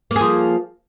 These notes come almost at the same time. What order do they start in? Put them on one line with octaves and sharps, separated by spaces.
A#3 G#4 F3